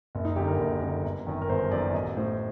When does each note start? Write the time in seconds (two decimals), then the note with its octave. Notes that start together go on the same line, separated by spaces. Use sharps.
0.15 F#1
0.25 D#4
0.36 F#2 D3 G4
0.48 A#4
0.59 F#1
0.81 F#2 D3
1.04 G1
1.26 F#2 D#3
1.42 A#4
1.49 G1 C5
1.71 F#2 D#3 D5
1.94 A1 D#5
2.17 A2 C5